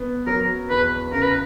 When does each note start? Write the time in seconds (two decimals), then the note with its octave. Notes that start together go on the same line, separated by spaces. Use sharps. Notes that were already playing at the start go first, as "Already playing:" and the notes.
Already playing: B3
0.27 F#3 A#4
0.70 E2 B4
1.12 C#3 A#4
1.22 B4